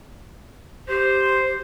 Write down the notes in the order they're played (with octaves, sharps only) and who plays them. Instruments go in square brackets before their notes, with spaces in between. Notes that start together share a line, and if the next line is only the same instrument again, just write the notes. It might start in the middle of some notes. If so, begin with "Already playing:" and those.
[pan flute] G4 [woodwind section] C5